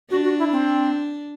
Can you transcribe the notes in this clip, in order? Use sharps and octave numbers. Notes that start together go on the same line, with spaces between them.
D4 F#4
F#4
E4
C4